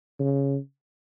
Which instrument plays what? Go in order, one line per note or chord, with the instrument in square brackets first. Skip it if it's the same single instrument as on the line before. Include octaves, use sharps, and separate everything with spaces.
[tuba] C#3